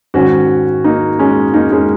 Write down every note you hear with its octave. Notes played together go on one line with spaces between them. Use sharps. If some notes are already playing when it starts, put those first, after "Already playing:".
G#2 D#3 C#4 F#4
A#3 D#4
G#3 C#4
A#3 D#4
G#3 C#4